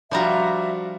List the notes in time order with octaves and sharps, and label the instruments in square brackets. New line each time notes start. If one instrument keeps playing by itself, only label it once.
[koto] F3 G3 A#5 [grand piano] D4 F4 F#4 [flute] E5